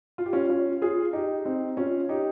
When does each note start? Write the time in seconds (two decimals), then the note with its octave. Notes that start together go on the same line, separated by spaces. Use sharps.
0.18 F4
0.26 G4
0.33 C#4 F4
0.49 C#4 F4
0.82 F4 G#4
1.13 D#4 G4
1.45 C4 D#4
1.77 C#4 F4
2.09 D#4 G4